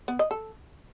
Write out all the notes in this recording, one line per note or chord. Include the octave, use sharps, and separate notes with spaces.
B3
D#5
A4